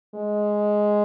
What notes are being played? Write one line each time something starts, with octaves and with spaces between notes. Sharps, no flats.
G#3